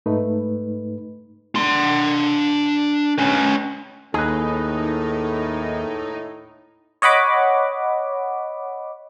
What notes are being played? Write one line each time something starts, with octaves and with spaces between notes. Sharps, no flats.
G#2 A3 D#4 B4
D4 C6
C#4 B4
D#2 A2 D#4 G#4 B4
C#5 D#5 F#5 B5 D6